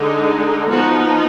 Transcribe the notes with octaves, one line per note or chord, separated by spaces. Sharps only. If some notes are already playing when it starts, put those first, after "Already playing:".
Already playing: D3 G#3 D#4
F3 B3 D#4 F#4